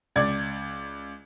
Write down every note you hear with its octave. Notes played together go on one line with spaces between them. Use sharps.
C#2 D5 G#6